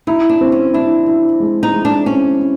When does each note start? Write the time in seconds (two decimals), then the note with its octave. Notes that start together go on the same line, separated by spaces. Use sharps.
0.07 D#4 E4
0.30 D4
0.41 C4
0.52 C#4
0.74 D4 E4
1.07 E4
1.40 G#3
1.63 D#4
1.74 G#3
1.85 D4
2.06 C4 C#4
2.40 C4